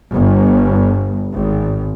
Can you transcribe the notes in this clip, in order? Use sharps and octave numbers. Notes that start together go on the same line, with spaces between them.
G1
G#1